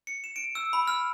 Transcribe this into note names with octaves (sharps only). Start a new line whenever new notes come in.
C#7
E7
D7
E6
B5
F6